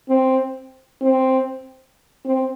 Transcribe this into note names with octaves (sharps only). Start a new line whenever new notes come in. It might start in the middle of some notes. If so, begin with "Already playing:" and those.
C4
C4
C4